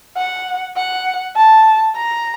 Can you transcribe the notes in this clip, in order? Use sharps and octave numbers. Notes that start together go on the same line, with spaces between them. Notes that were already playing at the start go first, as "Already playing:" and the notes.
F#5
F#5
A5
A#5